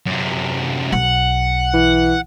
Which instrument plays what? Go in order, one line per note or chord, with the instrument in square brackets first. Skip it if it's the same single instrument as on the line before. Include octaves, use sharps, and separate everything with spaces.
[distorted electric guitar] F#2 C3
[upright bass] B1 [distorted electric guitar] F#5
[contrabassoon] E3